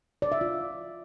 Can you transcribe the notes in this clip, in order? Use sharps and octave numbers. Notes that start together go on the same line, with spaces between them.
D5
E5
F4